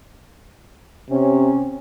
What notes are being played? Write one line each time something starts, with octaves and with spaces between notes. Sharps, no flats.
C3 C#4